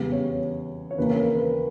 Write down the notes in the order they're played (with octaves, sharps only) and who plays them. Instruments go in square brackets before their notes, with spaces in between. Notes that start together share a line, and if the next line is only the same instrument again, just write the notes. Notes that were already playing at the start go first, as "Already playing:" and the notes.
Already playing: [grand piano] E2 C#3 G3
C#5
C#5
D#2 C#3 E3 A#3 B4
A#4
B4